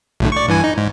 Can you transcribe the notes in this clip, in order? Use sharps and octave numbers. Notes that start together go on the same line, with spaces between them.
B1 A2 D3
D5 C#6
G2 E3 G#5
D#4
G#2